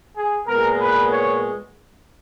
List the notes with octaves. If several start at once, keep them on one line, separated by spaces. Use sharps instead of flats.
G#4
A#2 G#3 B3 A#4
B4
C#5